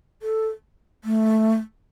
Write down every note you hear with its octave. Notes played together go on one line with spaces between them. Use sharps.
A4
A3